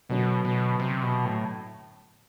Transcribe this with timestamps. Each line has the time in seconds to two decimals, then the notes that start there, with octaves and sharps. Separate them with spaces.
0.09 F#2 B2 D3 F#3
0.45 B2
0.80 C3
1.02 B2
1.25 A2